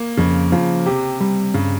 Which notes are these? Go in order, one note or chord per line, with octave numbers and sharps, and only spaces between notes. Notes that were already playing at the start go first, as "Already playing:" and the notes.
Already playing: A#3
F2 C#3
C#3 F3
C3 G4
G3
G2 C#3